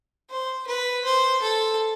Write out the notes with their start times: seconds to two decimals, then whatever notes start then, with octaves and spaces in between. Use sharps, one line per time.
0.30 C5
0.67 B4
1.05 C5
1.42 A4